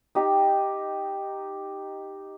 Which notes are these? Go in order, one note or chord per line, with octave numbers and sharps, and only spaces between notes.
D#4 G4